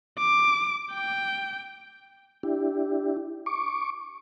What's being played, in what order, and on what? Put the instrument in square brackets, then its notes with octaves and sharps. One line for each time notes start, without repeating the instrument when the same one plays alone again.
[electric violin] D6
G5
[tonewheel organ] D4 E4 G4
C#6 D6